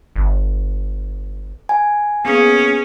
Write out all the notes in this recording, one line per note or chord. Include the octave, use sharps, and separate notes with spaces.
G1
G#5
A#3 B3 C#4 G#4